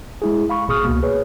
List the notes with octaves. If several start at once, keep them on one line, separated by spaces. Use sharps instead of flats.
G#3 E4 G#4
F5 B5 C#6
G#1 B2 G#4 C#6 D#6 F6
C#2 B2 A#3
G#4 B4 C#5